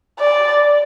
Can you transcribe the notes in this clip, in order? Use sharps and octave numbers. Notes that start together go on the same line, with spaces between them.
D5